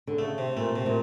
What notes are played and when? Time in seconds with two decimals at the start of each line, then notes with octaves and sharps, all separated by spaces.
0.07 D3
0.18 C#3 A3
0.38 C3
0.56 A#2 A3
0.76 C3
0.86 A#2